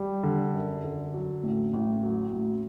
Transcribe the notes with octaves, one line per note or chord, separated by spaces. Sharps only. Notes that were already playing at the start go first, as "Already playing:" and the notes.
Already playing: G3
D3
F#2
D3
F#3
A1
A1
F#3
A1